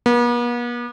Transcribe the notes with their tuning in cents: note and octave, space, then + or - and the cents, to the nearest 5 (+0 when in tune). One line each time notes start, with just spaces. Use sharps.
B3 -45